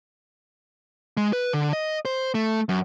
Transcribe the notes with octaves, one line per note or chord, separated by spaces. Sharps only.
G#3
B4
D3
D#5
C5
A3
F#2